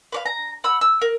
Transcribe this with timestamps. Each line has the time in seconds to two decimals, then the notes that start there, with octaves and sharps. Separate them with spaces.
0.12 B4 D5 F5
0.26 A#5
0.64 F#5 B5 E6
0.81 E6
1.02 A#4